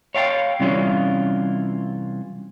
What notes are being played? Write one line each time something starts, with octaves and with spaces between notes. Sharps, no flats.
C#5 F5 G5 A5
C3 E3 G3 C#4 F4